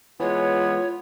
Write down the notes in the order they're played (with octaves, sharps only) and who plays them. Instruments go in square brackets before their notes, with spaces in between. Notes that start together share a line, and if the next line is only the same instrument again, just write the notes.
[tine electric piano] E3 G#3 [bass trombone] B3 [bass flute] F4 [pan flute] C#5